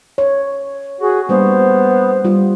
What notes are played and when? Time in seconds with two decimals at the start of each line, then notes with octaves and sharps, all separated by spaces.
0.18 C#5
1.01 F#4 G#4
1.29 G3 A#3 B3 D4 C5
2.25 G3 F4